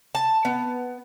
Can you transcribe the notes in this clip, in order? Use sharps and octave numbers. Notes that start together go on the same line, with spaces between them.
A5
B3